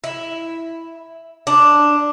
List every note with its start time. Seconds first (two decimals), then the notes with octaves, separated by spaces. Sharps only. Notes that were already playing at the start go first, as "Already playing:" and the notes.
0.04 E4
1.47 D4